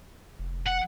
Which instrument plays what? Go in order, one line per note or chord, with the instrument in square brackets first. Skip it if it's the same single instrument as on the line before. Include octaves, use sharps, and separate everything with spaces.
[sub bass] F1
[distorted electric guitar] F#5